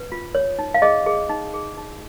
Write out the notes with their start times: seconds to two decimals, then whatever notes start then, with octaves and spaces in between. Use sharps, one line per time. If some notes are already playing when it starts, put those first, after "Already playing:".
Already playing: B4
0.12 F4
0.35 C#5
0.59 D#4
0.74 F5
0.82 G#4 D#5
1.06 G#4
1.29 D#4
1.54 G#4
1.78 D#4